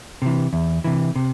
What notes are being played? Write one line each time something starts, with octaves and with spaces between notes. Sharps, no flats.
C3 E3
E2
C3 E3
C3